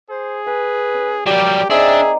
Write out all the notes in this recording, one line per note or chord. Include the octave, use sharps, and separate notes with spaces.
G#4 C5
B4 G#5
C#4
F#3 G3 A#3 G4 D5 G5
C4 D4 D#4 G#4 D5 E5